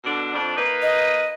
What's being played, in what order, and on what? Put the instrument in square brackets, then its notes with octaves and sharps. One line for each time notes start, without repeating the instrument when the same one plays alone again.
[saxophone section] B2 D3 D4
F2 D4
A#3 D#4 B4
[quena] D#5